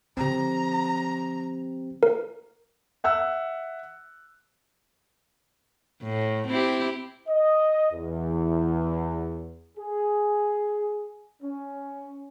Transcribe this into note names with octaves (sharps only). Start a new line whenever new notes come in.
D3 F3 C4 G4 A#5
A#4
E5 F#5 E6 F#6
A2
C4 E4 G4
D#5
E2
G#4
C#4